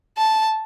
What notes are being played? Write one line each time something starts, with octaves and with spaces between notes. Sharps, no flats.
A5